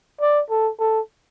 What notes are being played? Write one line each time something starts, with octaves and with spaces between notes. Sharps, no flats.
D5
A4
A4